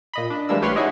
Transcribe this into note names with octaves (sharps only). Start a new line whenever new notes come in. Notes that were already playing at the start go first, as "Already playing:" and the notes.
A#2 D#5 B5
D4
E3 G3 G#3 A#3 D4 E6
A1 G4 B4 C#5 C6 F6
C#4 D#4 E4 F#4 G#4 D#5